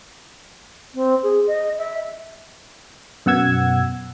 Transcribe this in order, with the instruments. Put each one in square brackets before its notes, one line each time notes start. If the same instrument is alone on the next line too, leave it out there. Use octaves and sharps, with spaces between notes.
[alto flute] C4
G#4
D#5
E5
[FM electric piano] F#2 B2 F#5 E6 G#6